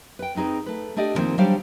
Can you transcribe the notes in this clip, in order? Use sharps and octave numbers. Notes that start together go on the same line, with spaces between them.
B4 G5
B3 C4 D#4 G#4 B4
A3 B4
A3 D4 G4 D5 D#5
D3 D#3 F3 A#3 C4 D#4
F#3 G3 D4 G4 C5 F5